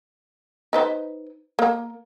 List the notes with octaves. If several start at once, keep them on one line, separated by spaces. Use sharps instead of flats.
D#4 B4 C5
A#3